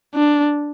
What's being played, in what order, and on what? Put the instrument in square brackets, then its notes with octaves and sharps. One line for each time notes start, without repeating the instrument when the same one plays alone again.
[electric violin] D4